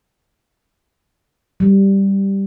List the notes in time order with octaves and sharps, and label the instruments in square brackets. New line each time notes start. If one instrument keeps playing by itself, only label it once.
[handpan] G3